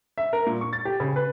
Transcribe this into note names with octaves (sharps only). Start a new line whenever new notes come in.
E5
A#4
A#2
C#6
A6
G4
C#3
B4